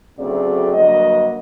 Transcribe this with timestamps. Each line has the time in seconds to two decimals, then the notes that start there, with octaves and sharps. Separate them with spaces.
0.17 D2 C#3 F#3 A3 C4 D5
0.72 G2 D3 F#3 A#3 D#5